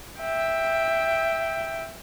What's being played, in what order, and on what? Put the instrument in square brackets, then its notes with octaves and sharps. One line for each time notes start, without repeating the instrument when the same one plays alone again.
[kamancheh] E5 G5